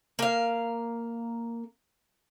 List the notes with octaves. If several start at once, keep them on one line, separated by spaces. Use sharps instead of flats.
A#3 F5